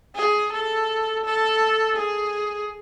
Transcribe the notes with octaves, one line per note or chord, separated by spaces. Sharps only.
G#4
A4
A4
G#4